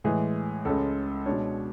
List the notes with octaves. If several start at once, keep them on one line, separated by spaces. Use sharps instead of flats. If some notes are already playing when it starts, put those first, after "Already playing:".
A2 E3 G#3 G#4
C#2 C#3 G#3 A4
B2 G#3 D4 C#5